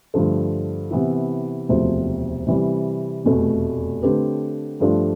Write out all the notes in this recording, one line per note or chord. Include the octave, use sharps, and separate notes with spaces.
G2 D3 F3 A3
C3 E3 B3 E4
E1 D2 C3 F3 C4
C3 E3 G3
F1 E2 B2 A3
D3 A3 C4 G4 B4
G2 F3 A3 D4 F4